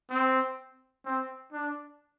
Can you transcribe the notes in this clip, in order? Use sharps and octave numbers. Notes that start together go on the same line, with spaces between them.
C4
C4
D4